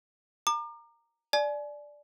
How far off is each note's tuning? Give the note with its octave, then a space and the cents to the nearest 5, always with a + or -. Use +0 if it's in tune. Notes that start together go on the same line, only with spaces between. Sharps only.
A#5 -10 D6 +35
D5 +0 G#5 +35